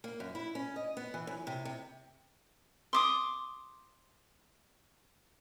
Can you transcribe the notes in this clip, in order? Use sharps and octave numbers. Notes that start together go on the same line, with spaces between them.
A#3
F#2
E4
C#4
D#5
B3
E3
F#2
C3
C3
C6 D6 D#6